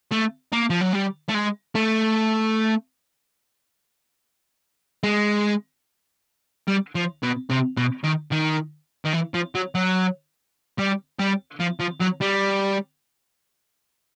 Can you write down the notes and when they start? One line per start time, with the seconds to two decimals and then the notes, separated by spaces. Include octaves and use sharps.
0.11 A3
0.52 A#3
0.70 F3
0.81 F#3
0.93 G3
1.28 A3
1.34 G#3
1.75 A3
5.03 G#3
6.68 G3
6.95 F3
7.23 B2
7.49 C3
7.77 B2
8.04 D#3
8.32 D#3
9.05 D#3
9.14 E3
9.34 F3
9.55 F#3
9.75 F#3
10.78 G3
11.19 G3
11.60 F3
11.80 F3
12.01 F#3
12.21 G3